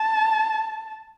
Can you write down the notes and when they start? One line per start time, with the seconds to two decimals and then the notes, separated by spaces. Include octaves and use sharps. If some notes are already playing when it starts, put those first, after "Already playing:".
Already playing: A5